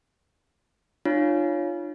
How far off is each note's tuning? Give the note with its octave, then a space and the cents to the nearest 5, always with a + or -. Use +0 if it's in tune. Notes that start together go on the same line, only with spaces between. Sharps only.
D4 +45 F4 -5 C#5 +5